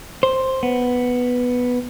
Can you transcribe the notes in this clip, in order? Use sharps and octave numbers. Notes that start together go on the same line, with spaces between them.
C5
B3